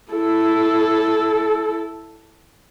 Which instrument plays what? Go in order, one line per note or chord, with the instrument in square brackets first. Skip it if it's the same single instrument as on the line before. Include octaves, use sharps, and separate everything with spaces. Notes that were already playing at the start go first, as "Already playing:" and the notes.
[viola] E4 A4